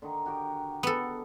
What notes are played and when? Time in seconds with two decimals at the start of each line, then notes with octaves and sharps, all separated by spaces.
0.02 D3 D#3 D#4
0.26 F#4 G4 A#4
0.83 B3 A4